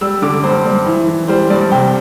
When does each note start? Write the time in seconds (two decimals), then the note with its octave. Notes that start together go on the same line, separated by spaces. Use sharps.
0.01 G3 E6
0.22 D3 D6
0.44 G2 C5
0.65 G2
0.86 E3
1.08 E3
1.28 G3 C5
1.50 G2 D5
1.71 C3 G5